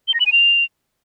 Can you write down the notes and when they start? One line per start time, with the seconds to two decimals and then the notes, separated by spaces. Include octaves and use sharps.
0.08 G7
0.14 A#6
0.20 F#7
0.26 D#7
0.32 F7